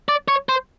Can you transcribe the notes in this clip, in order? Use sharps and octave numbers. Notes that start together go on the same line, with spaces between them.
D5
C#5
C5